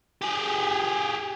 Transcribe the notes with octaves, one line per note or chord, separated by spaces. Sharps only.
G4 G#4